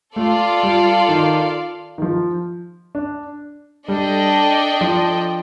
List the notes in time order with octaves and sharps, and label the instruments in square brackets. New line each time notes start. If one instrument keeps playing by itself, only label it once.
[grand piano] A3 [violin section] F4 A4 D5 F5
[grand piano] G3
D#3
D#3
F3
D4
[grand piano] G3 [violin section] D4 A4 D#5 G5
[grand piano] F3